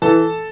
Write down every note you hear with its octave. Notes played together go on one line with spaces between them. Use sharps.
E3 A4 A5